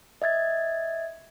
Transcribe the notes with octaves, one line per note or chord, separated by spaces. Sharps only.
D#5 E5 G#6 A6